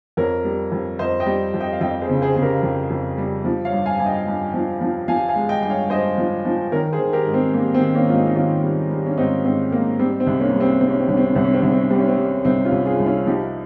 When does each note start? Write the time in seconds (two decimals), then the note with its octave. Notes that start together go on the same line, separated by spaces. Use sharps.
0.17 F2 A#4 C#5
0.44 G3
0.72 F2
0.99 F2 C5 D#5
1.20 D#5 G5
1.26 G3
1.54 F2
1.61 D#5 G5
1.73 F5
1.81 F2 D#5 G5
2.01 G#4 C5
2.09 C#3
2.22 G#4 C5
2.36 C#3 G#4
2.42 G4 A#4
2.63 F2
2.90 F2
3.18 G3
3.45 F3
3.65 C#5 F5
3.72 G2
3.86 F5 G#5
3.99 G2 G#5
4.06 D#5 G5
4.27 G2
4.54 F3
4.81 F3
5.08 F3 F5 G#5
5.28 F5 G#5
5.35 G#3
5.49 D#5 G5
5.62 G2 G5
5.70 C#5 F5
5.90 G2 C5 D#5
6.18 F3
6.45 F3
6.72 D#3 A#4 C#5
6.93 G#4 C5
6.99 D#3
7.13 G4 A#4
7.27 G#2
7.34 C4
7.54 G3 A#3
7.75 C4
7.81 D#3
7.95 A#3 C#4
8.09 G#2 F4
8.15 C4 D#4
8.26 D#4
8.36 D#3 C#4 F4
8.63 G3
8.90 G3
9.06 C#4
9.17 G#2 C4 D#4
9.45 G#2 C4
9.72 G#2 A#3
9.99 G3 C4
10.20 C4
10.27 C2
10.40 A#3 C#4
10.54 G3
10.60 C4
10.81 C3 C4
10.90 C#4
11.00 C4
11.08 C2 C#4
11.17 C4
11.26 C#4
11.36 C2 C4
11.44 C#4
11.53 C4
11.63 C2 C#4
11.72 C4
11.81 C#4
11.90 G3 C4
11.99 C#4
12.08 C4
12.18 G3
12.45 C2 C4 D#4
12.65 C#4 F4
12.72 C2
12.86 F4 G#4
13.00 C2
13.06 C#4 F4
13.26 F3 D#4 G4